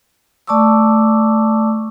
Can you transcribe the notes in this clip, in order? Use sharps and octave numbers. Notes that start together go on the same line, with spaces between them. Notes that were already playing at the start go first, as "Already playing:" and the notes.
A3 D5 A5 C#6 D6 E6